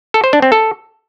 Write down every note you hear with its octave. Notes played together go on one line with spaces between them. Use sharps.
A4
C5
D4
C4
A4